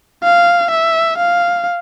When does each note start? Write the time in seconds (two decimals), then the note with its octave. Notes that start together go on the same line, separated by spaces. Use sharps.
0.23 F5
0.70 E5
1.17 F5